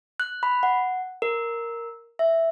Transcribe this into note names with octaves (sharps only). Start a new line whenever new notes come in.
F#6
B5
F#5
A#4
E5